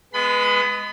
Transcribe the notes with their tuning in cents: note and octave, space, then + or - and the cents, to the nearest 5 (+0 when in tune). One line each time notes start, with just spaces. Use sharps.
G#3 +0 B3 +0 B5 +30